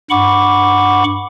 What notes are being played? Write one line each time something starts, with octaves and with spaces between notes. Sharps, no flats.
G2 F#5 B5 C#6 D6